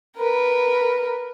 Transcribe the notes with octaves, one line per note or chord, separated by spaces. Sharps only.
A#4 B4